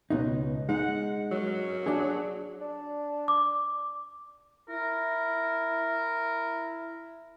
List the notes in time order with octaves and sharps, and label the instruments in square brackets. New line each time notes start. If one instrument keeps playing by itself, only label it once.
[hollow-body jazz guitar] C#2 B2 D#4
[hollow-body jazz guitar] G#3 D#4 [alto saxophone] F#5
[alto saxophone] F#3
[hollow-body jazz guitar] D4 G#4
[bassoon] D4
[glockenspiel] D6
[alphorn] E4 [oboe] A#4